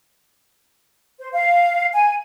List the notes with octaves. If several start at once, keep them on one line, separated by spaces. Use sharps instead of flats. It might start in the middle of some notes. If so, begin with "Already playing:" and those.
C5
F5
G#5